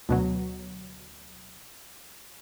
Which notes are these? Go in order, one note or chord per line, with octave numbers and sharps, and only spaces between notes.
D2 B2 F#3